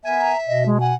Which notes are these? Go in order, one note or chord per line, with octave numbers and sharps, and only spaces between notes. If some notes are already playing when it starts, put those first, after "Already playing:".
B3 A#4 E5 G#5
A#5
B2 D#5
G#3
F#5 G#5